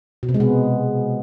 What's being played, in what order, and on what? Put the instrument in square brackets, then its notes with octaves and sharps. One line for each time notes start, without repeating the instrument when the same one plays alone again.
[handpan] B2
C3
G#3
B3